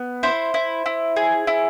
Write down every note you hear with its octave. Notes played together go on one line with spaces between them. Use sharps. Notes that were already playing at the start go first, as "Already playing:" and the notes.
Already playing: B3
E4 C5
E4
E4
G#4
E4